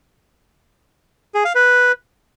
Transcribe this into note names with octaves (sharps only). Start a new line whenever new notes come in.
G#4
F5
B4